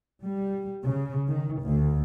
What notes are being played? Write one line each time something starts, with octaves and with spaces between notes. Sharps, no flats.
G3
C#3
D#3
D2